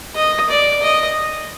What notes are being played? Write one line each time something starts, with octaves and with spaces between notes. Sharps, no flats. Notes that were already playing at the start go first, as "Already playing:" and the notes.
D#5
D5
D#5